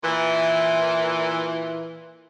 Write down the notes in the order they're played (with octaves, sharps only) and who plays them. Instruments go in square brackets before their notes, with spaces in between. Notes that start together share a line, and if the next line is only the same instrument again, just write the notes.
[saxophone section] A#2 E3